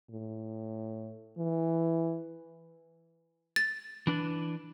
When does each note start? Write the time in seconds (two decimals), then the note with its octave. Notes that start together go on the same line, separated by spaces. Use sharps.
0.11 A2
1.38 E3
3.56 A6
4.07 E3 D4 B4